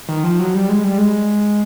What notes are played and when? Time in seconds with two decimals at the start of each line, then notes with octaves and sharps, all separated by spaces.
0.09 D#3
0.24 F3
0.39 F#3
0.55 G3
0.69 G#3
0.84 G3
0.98 G#3